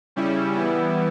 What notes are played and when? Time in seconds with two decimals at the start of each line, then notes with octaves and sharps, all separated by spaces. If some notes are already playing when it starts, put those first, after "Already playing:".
0.16 C#3 G3 C#4 E4
0.53 E3 G3 B3 E4